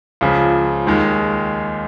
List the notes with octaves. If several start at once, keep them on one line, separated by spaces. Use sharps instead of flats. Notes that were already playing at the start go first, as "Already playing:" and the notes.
C#2 C#3 F3
D#2 D#3 G#3